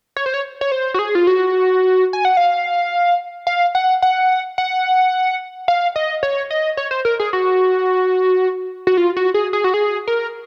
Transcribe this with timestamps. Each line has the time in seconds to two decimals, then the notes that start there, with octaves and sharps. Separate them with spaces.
0.16 C#5
0.26 C5
0.34 C#5
0.61 C#5
0.72 C5
0.94 F#4
0.99 G#4
1.15 F4
1.27 F#4
2.13 G#5
2.25 F#5
2.37 F5
3.47 F5
3.75 F#5
4.02 F#5
4.58 F#5
5.68 F5
5.96 D#5
6.23 C#5
6.51 D#5
6.77 C#5
6.91 C5
7.05 A#4
7.20 G#4
7.33 F#4
8.87 F#4
8.97 F4
9.17 F#4
9.34 G#4
9.53 G#4
9.64 F#4
9.74 G#4
10.08 A#4